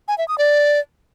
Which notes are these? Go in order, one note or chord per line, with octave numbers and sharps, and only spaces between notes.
G#5
E5
D#6
D5